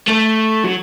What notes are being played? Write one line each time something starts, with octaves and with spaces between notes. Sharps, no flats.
A3
F#3